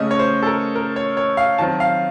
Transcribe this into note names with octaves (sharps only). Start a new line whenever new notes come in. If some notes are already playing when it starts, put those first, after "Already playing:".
Already playing: C#3 A3 C#4 D#5
C#5
C5
A4
A#4
A#4
C#5
C#5
F5
D#3 F#3 C4 A5
F5